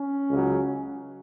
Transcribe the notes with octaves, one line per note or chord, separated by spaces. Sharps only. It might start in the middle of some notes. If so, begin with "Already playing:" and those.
Already playing: C#4
C#2 C#3 F#3